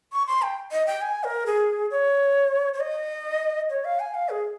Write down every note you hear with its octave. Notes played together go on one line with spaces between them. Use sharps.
C#6
C6
G5
D#5
G5
G#5
A#4
G#4
C#5
C#5
D#5
C#5
F5
G#5
F5
G#4